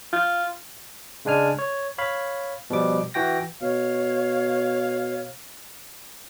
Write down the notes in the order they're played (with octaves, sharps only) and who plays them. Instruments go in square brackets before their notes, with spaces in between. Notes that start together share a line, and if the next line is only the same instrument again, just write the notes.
[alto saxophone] F4
[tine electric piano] C#3 G#3 D4 G#5 F6
C#5
C#5 F5 B5
B2 F3 G3 D6
E3 F#4 G5 A#6
[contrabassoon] B2 [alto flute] C#5 [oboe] F5